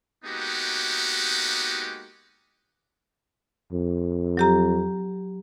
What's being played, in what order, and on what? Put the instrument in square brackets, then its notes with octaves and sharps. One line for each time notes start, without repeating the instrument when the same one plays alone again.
[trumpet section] G#3 A#3 B3 D#4 F#4 G4
[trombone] F2
[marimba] F#3 G4 A#5